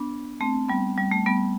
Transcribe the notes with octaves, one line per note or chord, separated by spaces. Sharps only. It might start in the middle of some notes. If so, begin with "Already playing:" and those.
Already playing: B3 D4
A3 C4
G3 B3
G3
A3
G3 B3